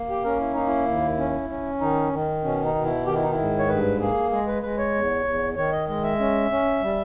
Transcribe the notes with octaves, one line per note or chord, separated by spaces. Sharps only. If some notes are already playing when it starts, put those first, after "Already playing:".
Already playing: A#3
G4
C#4 A#4
E4
A#3 D#4
E4
D#2
C#4
C#4
D#3 D#4
D#3
B2 C#4
D#4
B2
E4
D#3 G4
E4
D#4
E4
G#2
C#5
G2 B4
A#3 G#4
G#3 G#4
B4
G#3 B4
C#5
E2
E2
D#3 C#5
D#5
G#3 D#5
E5
C#4
C#4
G3